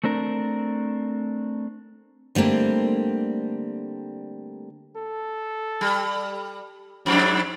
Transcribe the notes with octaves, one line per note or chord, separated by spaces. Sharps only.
A3 C4 D4 A#4
D3 G3 A3 A#3 C4
A4
G3
F2 G#2 F#3 D4